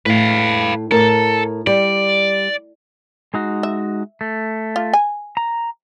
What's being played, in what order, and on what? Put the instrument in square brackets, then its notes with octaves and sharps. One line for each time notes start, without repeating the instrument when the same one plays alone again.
[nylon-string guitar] A2 [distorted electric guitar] B4 F5
[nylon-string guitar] A2 A#4 [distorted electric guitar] A4
[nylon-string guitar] G3 [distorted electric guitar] D5
[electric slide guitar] G#3 D#4 F#4
[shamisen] E5
[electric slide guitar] A3
[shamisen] F4
G#5
[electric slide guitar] A#5